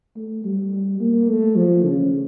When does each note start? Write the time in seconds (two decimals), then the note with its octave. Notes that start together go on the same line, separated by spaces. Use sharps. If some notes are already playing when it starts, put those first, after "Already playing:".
0.16 A3
0.45 G3
1.00 A#3
1.29 A3
1.56 F3
1.85 C#3